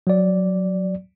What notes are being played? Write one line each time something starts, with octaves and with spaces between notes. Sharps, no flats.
F#3 D5